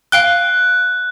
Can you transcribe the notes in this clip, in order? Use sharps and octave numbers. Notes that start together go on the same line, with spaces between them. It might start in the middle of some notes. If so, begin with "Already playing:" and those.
F5 G5 F#6 G7